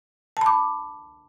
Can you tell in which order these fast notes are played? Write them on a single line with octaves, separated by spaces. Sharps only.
A5 B5 D6